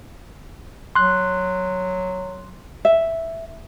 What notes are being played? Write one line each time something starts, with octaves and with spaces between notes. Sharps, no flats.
F#3 C6 F#6
E5